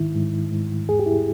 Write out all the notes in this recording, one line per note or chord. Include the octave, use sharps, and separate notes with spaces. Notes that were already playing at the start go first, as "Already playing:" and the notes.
Already playing: G#2 D#3 E4
G#2
G#2
E2 G#4
G4
E4